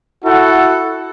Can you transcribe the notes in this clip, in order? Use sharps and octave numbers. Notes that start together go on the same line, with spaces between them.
E4 F#4 A4 F#5